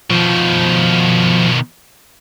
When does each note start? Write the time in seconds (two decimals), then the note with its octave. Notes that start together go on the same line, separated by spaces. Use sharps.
0.10 B2 D#3 F3